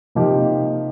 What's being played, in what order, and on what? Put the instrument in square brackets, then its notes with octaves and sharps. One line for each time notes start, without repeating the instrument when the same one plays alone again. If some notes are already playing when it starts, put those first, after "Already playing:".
[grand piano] C3 F3 A#3 D#4 G4